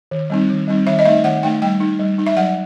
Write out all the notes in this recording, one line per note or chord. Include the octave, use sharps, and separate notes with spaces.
D#3
G3 C4 D#4
D#3
G3 C4 D#4
D#3 E5
D#5
A3 D#4 E5
D#3 F#5
A3 D#4 G5
G3 G5
D#4
G3
D#4
E5
F#3 F#5